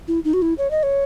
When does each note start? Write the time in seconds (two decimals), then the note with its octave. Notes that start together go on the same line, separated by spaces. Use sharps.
0.08 E4
0.24 D#4
0.33 F#4
0.42 E4
0.58 C#5
0.71 D#5
0.83 C#5